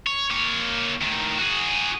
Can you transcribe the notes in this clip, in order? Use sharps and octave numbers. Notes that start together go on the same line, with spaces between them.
C#5
A#3 C#5
A2 D#3
F#4 G#4